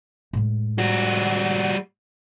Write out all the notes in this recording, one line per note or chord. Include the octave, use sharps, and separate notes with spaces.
A2 G#3
G3 F#4